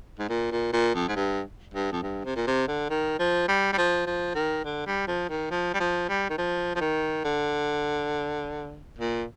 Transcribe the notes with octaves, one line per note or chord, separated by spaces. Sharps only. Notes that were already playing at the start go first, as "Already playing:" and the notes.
G#2
A#2
A#2
A#2
F2
G#2
G2
G2
F2
G2
C3
A#2
C3
D3
D#3
F3
G3
G3
F3
F3
D#3
D3
G3
F3
D#3
F3
G3
F3
G3
D#3
F3
F3
D#3
D3
A#2